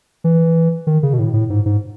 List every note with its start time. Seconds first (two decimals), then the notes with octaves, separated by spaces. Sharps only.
0.24 E3
0.87 D#3
1.03 C#3
1.13 B2
1.19 A2
1.34 A2
1.50 G#2
1.66 G#2